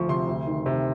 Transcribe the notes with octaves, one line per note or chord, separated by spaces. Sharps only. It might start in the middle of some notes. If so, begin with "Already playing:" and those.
Already playing: D2 F3 C#6
C3 C6
D2
D#3
C3